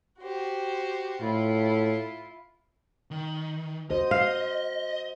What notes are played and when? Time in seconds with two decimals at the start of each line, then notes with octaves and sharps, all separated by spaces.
0.20 F#4 G4 C5
1.21 A2 E4 F4
3.11 D#3
3.91 F#4 C5 D#5
4.11 F5